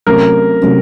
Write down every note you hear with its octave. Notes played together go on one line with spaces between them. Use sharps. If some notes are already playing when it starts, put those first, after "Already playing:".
C3 F#3 A3 C#4 A#4
C3 F#3 A3 C#4